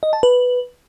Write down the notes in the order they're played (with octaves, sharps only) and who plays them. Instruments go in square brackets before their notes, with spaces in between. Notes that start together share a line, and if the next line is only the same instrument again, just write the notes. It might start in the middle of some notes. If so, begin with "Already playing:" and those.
[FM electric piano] D#5
A5
B4